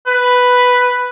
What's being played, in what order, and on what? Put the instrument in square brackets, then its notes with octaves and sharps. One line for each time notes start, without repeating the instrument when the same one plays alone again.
[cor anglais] B4